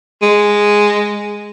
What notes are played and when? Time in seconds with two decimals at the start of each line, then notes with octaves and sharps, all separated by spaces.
0.22 G#3